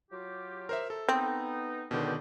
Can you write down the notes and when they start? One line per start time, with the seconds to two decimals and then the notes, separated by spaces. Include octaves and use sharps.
0.11 F#3 F4 G4
0.69 A#4 C5 E5
0.90 A4
1.09 B3 C4 D#4
1.91 C#2 B2 D3 D#3 D5 G5